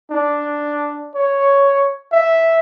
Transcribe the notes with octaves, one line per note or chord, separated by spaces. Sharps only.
D4
C#5
E5